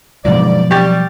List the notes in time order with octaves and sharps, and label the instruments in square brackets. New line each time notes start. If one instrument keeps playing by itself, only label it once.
[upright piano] G1 G#2 [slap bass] B2 F3 F#3 [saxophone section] D5
[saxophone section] G3 [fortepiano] G4 [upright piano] C#6 A6